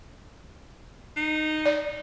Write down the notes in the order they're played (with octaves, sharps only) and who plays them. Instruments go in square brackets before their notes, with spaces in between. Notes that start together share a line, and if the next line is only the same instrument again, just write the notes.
[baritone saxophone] D#4
[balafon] D5